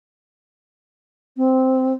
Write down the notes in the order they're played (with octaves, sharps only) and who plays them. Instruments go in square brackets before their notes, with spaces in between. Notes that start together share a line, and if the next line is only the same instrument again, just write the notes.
[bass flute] C4